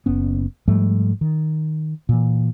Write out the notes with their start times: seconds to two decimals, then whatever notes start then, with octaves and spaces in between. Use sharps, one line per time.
0.06 F#1 B3 C#4
0.68 G#2 F3 G3 A3
1.21 D#3
2.09 A#2 E3